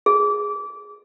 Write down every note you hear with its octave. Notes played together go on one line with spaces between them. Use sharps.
G#4